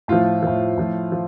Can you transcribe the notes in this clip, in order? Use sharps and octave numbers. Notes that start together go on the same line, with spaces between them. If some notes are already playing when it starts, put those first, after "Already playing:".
A2 F3 F4
A2 F3
A2 F3
F3